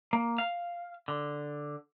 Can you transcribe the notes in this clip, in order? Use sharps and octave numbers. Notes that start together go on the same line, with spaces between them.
A#3
F5
D3